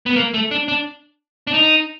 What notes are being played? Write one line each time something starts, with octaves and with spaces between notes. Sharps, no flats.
B3
A#3
A3
D4
D4
D4
D#4